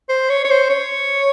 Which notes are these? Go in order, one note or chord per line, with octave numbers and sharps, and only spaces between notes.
C5
C#5
C#5
C5
C#5